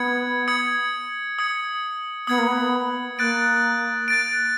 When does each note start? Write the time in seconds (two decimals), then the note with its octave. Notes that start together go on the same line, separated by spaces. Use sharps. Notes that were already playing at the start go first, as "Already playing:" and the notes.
Already playing: B3 D#6 G#6 C#7
0.48 D#6 G#6 C#7
1.39 D#6 G#6 C#7
2.27 B3 D#6 G#6 C#7
2.38 A#3
2.47 B3
3.18 A#3 F#6 A6 D7
4.08 F#6 A6 D7